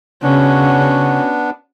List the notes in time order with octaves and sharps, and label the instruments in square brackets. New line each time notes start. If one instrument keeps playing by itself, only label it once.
[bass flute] C#3 [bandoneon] B3 D4 [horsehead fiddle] C#4 F#4